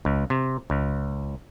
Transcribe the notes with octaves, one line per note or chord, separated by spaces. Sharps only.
C#2
C3
C#2